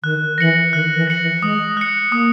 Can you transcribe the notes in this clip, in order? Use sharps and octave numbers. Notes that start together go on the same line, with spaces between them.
D#3 F#6
E3 A#6 C#7 F#7
D#3 F#6
E3
A#6 C#7 F#7
E3
G#3 D#6
F#6 C#7
A#3 D#6